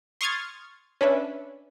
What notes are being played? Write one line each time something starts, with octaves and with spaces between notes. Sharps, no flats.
C6 C#6 D#6 F6 G#6 A6
C#4 D4 B4 E5